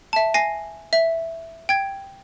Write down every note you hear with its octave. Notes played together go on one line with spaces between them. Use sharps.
E5 A5
G#5 A#6 C7
E5
G5 G#6